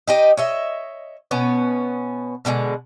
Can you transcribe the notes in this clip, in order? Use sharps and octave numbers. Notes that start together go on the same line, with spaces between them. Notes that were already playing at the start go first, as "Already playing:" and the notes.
D#4 G4 D#5
C#5 D#5 E5
B2 B3 C#4
B2 D3 F3 G#3